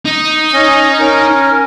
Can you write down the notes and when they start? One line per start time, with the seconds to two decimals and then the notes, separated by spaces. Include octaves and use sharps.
0.05 D#4
0.53 C#4 D#5
1.00 C#4 A#4